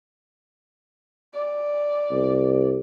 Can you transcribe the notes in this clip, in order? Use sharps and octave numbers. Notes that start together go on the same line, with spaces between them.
D5
C2